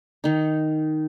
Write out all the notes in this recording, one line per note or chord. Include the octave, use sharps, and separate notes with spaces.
D#3 D#4